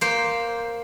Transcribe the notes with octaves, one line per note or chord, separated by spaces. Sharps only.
A#3 C5